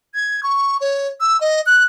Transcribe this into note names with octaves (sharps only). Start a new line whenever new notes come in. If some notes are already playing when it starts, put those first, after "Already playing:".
G#6
C#6
C#5
E6
D#5
F#6